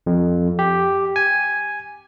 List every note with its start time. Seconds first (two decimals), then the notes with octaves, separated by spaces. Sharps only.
0.07 F2
0.59 G4
1.16 G#5